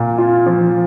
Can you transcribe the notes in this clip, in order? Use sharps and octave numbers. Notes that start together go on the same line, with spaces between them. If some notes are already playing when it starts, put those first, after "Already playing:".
Already playing: A#2 A#3
F4
F3